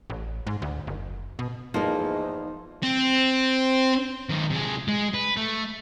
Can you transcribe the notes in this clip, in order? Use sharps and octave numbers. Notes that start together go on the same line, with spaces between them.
A1
G#2
D2
F#1
B2
E2 G#2 F3 A#3 D#4
C4
D#3 F#3
C3 G#3
G#3
B4
A3